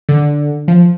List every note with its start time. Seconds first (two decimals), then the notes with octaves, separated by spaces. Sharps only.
0.09 D3
0.68 F3